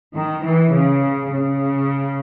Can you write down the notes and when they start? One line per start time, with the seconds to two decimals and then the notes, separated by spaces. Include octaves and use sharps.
0.14 D#3
0.43 E3
0.72 C#3
1.32 C#3